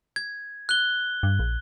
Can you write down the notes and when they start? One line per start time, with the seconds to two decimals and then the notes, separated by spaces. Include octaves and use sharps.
0.16 G#6
0.69 F#6 G7
1.23 G2
1.39 A#1